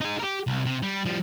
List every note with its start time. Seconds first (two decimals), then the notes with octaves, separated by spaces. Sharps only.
0.01 D#4 G#4
0.20 G4 A#4
0.47 C2
0.66 C3
0.82 G3
1.05 F3 G3